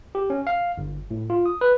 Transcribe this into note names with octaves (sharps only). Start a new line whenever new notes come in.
G4
C#4
F5
G1
A2
F4
D#6
B4